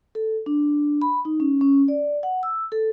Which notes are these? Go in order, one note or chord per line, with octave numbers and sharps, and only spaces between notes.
A4
D4
B5
D#4
C#4
C#4
D5
F#5
E6
A4